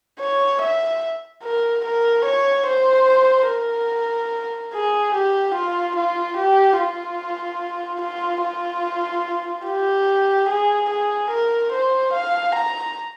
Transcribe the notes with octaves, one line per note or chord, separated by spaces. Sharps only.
C#5
E5
A#4
A#4
C#5
C5
A#4
G#4
G4
F4
F4
G4
F4
F4
F4
G4
G#4
G#4
A#4
C5
F5
A#5